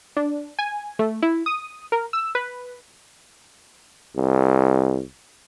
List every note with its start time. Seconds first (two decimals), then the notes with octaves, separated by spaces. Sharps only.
0.17 D4
0.59 G#5
0.99 A3
1.22 E4
1.46 D#6
1.92 A#4
2.13 E6
2.35 B4
4.16 C2